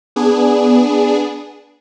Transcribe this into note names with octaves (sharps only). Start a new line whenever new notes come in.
B3 D4 G#4